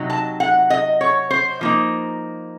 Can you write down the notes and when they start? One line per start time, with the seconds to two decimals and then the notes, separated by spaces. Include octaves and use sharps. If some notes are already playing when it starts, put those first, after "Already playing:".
Already playing: C3 F#3 D#4
0.10 A5
0.40 F#5
0.70 D#5
1.01 C#5
1.31 C5
1.61 F3 A#3 D#4